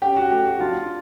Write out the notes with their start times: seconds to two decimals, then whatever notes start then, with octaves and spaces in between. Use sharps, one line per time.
0.02 C#4 G4
0.16 F#4
0.31 A3 G4
0.45 F#4
0.60 D4 F4